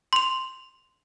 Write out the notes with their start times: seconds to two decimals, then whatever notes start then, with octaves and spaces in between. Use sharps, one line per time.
0.13 C6 F7